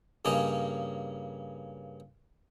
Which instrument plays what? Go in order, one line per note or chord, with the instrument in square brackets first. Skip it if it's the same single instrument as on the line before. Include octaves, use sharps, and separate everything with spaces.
[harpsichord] G2 C#3 A#3 C#4 D#5